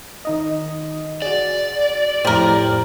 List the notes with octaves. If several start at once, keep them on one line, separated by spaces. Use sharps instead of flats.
D#3 D#4 D#5
F#4 G#4 D5
F2 A2 G3 G4 A#4 C5